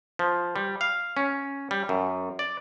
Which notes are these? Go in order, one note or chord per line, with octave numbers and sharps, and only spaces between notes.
F3
G3
F5
C#4
G3
F#2
D5